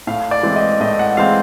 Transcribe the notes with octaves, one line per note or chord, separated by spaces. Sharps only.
A2 F5
D5
E3 G#3 C4
D#5
A2 D#5
F#5
E3 G#3 C4 F5